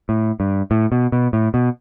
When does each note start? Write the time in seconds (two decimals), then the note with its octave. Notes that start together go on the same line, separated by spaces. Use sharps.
0.09 A2
0.40 G2
0.71 A2
0.92 B2
1.12 B2
1.33 A2
1.54 B2